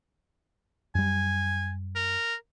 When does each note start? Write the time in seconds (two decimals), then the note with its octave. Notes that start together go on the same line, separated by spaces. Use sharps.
0.95 F#2 G3 G#5
1.96 A#4